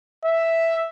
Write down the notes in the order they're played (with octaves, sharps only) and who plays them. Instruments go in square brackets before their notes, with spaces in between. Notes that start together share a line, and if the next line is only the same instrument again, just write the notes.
[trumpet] E5